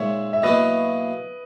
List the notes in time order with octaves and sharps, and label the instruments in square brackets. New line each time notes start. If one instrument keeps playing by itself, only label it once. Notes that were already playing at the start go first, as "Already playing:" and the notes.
Already playing: [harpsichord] A#2 G#3 D#4 [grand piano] C#5 E5
[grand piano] E5
[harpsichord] B2 F#3 A#3 E4 [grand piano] B4 D#5